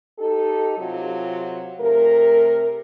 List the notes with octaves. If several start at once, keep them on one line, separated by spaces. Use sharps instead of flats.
D#4 G4 A4
C3 F#3 F4
C3 A3 A#4